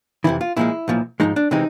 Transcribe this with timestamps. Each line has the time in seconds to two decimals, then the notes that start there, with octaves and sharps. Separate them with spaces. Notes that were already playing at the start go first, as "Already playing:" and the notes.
0.24 F2 C3 E3 E4
0.41 F4
0.57 A#2 F3 G#3 E4
0.88 B1 A#2 F3
1.20 G#2 F3 G#3 D#4
1.36 D4
1.51 C3 E3 G#3 C4 D#4